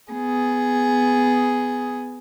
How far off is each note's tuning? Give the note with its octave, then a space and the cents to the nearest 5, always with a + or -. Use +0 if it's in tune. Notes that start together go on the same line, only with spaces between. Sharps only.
B3 +15 G#4 +0